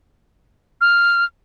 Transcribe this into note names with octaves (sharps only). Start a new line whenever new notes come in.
F6